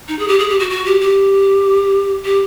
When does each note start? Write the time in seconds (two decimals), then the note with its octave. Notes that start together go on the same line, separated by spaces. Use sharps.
0.08 D#4
0.19 G#4
0.28 G4
0.39 G#4
0.49 G4
0.59 F#4
0.70 F#4
0.86 G4
1.01 G4
2.25 G4